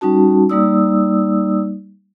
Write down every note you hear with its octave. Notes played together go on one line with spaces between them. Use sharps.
G3 C#4 D#4 F#4 A5
G3 A#3 D#4 D5 D#6 E6